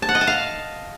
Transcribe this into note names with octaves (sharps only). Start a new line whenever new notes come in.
A5
F#5
D#5
A5
F5